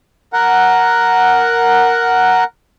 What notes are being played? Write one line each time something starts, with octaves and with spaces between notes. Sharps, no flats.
A#4 F#5